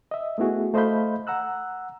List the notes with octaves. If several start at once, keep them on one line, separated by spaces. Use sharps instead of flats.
D#5 E5
A3 B3 E4 F#4 G#4
A3 C5 D#5 F5 B5 G6
F#5 A#5 E6 F#6